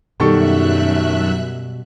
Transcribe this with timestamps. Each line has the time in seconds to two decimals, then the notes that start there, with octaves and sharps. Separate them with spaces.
0.20 F#2 B2 D#3 G3 A4 E5 C#6 F#6